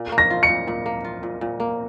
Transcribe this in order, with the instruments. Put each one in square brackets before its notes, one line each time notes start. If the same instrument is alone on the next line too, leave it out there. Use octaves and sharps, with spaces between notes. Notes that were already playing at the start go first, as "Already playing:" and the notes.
Already playing: [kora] A#2
A#3
[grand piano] A#6
[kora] F4
[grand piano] C#7
[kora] A#2
A#2
A#3
F4
A#2
A#2
A#3